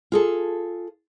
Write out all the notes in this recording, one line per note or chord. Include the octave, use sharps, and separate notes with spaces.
F4 G#4 A4